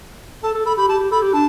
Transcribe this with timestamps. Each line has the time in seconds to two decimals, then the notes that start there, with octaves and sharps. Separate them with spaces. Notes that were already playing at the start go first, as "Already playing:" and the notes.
0.43 A4 A5
0.55 A4
0.66 A4 B5
0.77 G4 B5
0.88 G4 A5
1.00 G4
1.11 A4 B5
1.23 G4
1.33 D4 A5